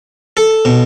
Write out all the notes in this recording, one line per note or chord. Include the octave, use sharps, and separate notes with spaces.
A4
B2